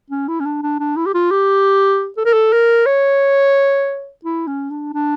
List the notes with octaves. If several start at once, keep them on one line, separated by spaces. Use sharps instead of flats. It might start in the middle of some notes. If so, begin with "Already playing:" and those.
C#4
E4
C#4
D4
D4
D4
E4
G4
F4
G4
A4
A#4
A4
A#4
C#5
E4
C#4
D4
D4